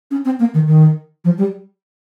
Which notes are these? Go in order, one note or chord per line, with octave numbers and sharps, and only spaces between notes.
C#4
C4
A#3
D#3
D#3
F3
G3